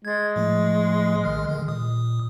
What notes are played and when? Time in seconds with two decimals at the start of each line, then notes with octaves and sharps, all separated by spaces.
0.05 G#3 G#6 A6
0.36 A2 F3 A3
1.24 A#1 D#3 F6
1.49 D3 D#3
1.68 A#2 D#6